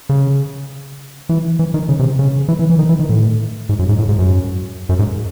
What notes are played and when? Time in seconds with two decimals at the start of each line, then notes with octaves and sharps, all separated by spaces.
0.09 C#3
1.29 E3
1.59 E3
1.74 D#3
1.89 C#3
1.99 C3
2.19 C#3
2.48 E3
2.59 E3
2.70 E3
2.79 D#3
2.89 E3
2.99 D#3
3.09 A2
3.69 G#2
3.79 F#2
3.89 G#2
3.99 A2
4.09 G#2
4.19 F#2
4.89 F#2
4.99 G#2